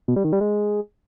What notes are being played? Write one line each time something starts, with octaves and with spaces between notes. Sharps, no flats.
B2
G3
D#3
G3
G#3